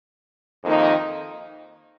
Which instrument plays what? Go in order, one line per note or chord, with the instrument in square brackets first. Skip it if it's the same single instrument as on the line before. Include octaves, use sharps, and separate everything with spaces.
[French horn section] F2 D#3 A#3 D#4